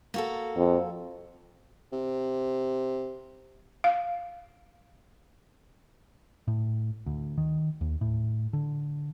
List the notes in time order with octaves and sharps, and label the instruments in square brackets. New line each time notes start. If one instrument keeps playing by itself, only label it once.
[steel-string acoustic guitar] A#3 F#4 A4
[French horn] F2
[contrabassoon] C3
[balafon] F5
[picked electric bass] A2
D2
D#3
D#2
A2
D3